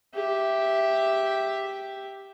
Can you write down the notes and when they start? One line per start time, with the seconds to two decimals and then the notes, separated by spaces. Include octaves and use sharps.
0.14 G4 E5